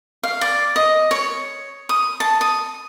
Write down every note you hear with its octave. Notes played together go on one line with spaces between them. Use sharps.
F5
D5
D#5
C#5
D#6
A5
D#6